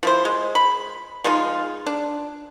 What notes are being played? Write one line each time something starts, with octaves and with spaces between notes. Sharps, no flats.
F3 E4 C5
G#3
B5
F3 G#3 D#4 F4
D4